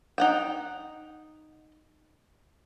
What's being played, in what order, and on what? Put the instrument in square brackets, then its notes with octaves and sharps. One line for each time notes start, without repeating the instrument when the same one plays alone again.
[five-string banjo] D#4 F#5 G5